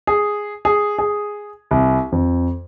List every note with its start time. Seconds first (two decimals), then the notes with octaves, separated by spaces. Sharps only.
0.07 G#4
0.65 G#4
0.99 G#4
1.71 C2
2.12 F2